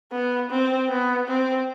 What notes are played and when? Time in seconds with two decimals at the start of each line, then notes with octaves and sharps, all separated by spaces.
0.12 B3
0.51 C4
0.89 B3
1.28 C4